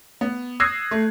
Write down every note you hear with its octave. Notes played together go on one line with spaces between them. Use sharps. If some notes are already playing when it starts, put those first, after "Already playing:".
B3
D#6 E6 F#6 G#6 A#6 C7
A3